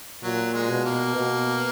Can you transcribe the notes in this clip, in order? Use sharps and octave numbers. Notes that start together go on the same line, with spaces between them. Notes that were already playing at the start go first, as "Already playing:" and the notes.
A#2 F#3
G#3
B2
A#3
B2